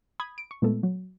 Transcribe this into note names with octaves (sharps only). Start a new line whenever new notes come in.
B5 D#6 G#6
D7
C#6
A#2 G#3 A3 B3 A4
F#3